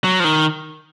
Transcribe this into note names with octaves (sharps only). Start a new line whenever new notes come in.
F#3
F3
D#3